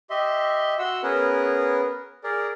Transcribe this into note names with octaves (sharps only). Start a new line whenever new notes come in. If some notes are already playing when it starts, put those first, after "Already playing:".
G4 D#5 E5 C6
F#4 F#5 C6 E6
B3 C#4 G#4 A#4 B4
G#4 A#4 D5